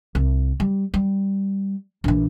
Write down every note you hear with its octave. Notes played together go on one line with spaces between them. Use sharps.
C2
G3
G3
A#1 E3